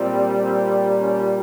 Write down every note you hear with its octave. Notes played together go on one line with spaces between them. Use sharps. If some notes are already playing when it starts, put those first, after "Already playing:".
Already playing: A#2 G3 C4
C4
C#4